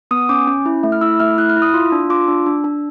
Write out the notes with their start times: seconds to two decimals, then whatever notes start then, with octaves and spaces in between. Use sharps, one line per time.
0.11 B3 D#6
0.29 C#4 D6
0.47 C#4
0.66 E4
0.83 A3
0.92 F6
1.01 E4 E6
1.20 A3 F6
1.38 E4 F#6
1.49 F6
1.56 E4
1.62 D#6
1.74 F4
1.92 D4
2.10 F4 D6
2.28 D4
2.46 D4
2.64 D4